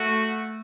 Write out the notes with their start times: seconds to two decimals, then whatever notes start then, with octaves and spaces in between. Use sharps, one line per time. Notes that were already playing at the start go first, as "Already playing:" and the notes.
Already playing: A3 F#4